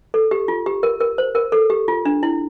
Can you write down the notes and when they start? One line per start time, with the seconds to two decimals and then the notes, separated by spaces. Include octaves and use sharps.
0.14 A4
0.31 G4
0.48 F4
0.66 G4
0.83 A#4
1.00 A#4
1.18 C5
1.35 A#4
1.52 A4
1.70 G4
1.88 F4
2.05 D4
2.23 E4